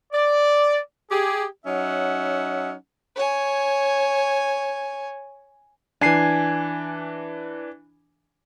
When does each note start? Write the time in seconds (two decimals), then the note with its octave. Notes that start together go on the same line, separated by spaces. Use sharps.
0.13 D5
1.11 G4 G#4
1.66 F#3 C#4 D#4 E5 F#5
3.15 C#5 G#5
6.01 E3 D4 G#5 C7